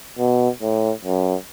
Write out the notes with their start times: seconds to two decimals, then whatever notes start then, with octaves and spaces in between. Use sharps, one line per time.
0.19 B2
0.62 A2
1.05 F#2